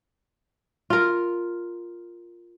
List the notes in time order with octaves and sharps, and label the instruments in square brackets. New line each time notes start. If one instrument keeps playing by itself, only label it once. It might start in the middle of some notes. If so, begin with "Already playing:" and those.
[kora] F4 A#4